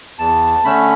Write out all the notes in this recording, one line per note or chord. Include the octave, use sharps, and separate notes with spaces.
E2 A5
D3 A3 C#4 B5